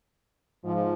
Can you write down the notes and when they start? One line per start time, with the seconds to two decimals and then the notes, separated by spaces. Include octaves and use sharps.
0.63 G#2 F3